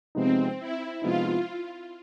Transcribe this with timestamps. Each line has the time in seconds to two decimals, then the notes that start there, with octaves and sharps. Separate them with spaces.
0.15 C3 F3 G#3 B3 C4 D#4
0.59 E4
1.02 C3 F3 G#3 B3 D#4 F4